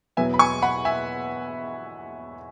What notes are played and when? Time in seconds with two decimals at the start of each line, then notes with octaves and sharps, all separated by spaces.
0.17 E2 B2 F#3 B3 E5 G#5
0.34 B5
0.39 G#5 C#6
0.62 F#5 B5
0.85 E5 G#5